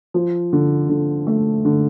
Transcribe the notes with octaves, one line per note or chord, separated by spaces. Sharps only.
F3
D3
D3
A3
D3